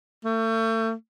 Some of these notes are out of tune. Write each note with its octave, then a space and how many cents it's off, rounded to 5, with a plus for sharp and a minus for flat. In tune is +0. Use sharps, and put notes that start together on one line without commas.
A3 +35